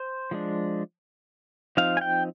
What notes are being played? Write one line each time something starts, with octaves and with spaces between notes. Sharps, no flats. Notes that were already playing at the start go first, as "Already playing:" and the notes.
Already playing: C5
F3 G#3 D4
F3 C4 D#4 F5
G#5
G5